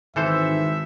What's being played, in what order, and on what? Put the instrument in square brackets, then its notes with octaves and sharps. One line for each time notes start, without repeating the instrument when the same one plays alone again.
[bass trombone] G#1 [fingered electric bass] D#3 [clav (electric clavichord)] E3 A4 C5 [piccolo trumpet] E5